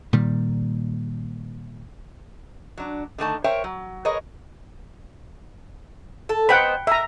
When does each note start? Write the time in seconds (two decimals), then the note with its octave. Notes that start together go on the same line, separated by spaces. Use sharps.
0.13 A#2 D#3 G3
2.77 F#3 D4
3.18 D3 D#3 A3 A5
3.44 A#4 C5 C#5 E5 G5
3.64 F#3
4.05 G#4 A#4 B4 C#5 D#5
6.29 A4
6.49 B3 C4 D#4 F#5 G5 B5
6.87 A#4 E5 A#5